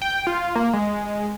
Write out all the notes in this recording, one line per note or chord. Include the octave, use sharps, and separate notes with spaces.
G5
F4
A#3
G#3